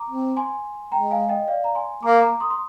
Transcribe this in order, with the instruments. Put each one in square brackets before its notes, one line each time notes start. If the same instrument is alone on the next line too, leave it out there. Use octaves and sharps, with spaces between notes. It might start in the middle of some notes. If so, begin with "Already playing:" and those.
Already playing: [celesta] A#5 D6
[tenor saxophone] C4
[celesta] G#5 C6
[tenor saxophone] G#3 [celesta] G5 A#5
[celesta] F5 G#5
D#5 G5
D5 F5
A#5
G#5 C6
[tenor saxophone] A#3 [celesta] A#5 D6
[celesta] A#5 D6
C6 D#6
C6